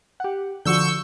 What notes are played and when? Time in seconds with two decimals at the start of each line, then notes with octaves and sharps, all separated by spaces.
0.20 G4 F#5
0.65 D3 F3 F#4 C#6 E6 G6